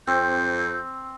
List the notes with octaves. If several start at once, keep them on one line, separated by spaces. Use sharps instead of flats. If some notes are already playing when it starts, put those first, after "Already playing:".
F2 C4 G6